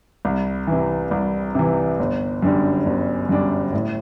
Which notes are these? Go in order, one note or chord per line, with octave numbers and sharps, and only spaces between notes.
C2
C3 E3
C2
C3 E3
G1
F#2 D3 G3 D4
G1
F#2 D3 G3 D4
A2